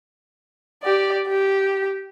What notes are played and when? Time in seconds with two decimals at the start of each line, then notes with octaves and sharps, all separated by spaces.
0.83 G4 D5
1.28 G4